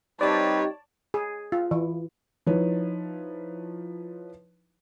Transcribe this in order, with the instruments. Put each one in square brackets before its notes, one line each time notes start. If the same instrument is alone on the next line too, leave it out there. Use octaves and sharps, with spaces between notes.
[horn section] G3 C4 B4 [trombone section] D#4 G4 [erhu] C#5 [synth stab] D5 A5
[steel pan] G#4
F4
E3
[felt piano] F3 D#4 E4 B4 C#5